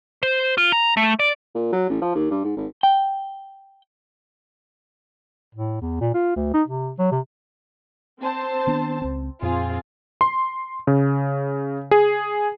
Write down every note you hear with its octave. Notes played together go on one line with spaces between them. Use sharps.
C5
F4
A#5
A3
D5
A#2
F#3
A1
F3
D#2
G2
G#2
G#1
G5
A2
E2
A#2
F4
D2
D#4
C3
F#3
C3
C4 C5 A5
D#3 B3 D4
C#2 C4
F2 A#2 C4 F4 G#4
C6
C#3
G#4